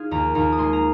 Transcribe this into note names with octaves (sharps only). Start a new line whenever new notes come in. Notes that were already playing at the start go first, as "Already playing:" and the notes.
Already playing: D#4 F4 G#4
D#2 A#5
D#2 A#5
D#6
G#3 C6
A#5